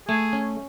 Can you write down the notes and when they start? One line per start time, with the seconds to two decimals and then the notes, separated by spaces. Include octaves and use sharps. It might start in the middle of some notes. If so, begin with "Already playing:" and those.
0.08 A3 G#4
0.33 C#4